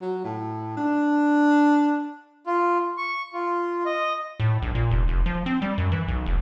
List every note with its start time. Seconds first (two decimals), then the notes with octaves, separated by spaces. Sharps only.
0.02 F#3
0.24 A2
0.77 D4
2.47 F4
2.97 C#6
3.33 F4
3.85 D#5
4.40 A2
4.62 A#1
4.75 A#2
4.91 F1
5.08 F1
5.26 F3
5.46 C4
5.62 G3
5.78 F#2
5.92 E3
6.08 B1
6.26 F1